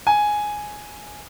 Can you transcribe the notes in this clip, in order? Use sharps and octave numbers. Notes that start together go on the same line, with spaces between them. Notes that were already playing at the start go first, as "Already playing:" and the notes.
G#5